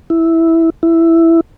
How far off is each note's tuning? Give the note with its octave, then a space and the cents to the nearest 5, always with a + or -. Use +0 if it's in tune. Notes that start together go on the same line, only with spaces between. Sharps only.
E4 -5
E4 +5